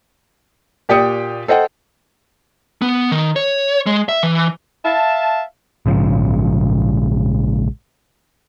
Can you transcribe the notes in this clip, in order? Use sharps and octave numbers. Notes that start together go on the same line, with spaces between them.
A#2 G4 D5 G5 D#6 C#7
A4 C5 D#5 F#5 G5
B3
D#3
C#5
G#3
E5
E3
E5 F5 A5
A#1 G#2 C#3 F3